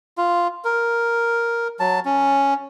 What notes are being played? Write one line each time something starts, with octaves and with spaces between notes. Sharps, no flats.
F4
A#4
F#3 A5
C#4